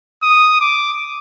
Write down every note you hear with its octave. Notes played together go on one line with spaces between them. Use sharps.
D#6
D6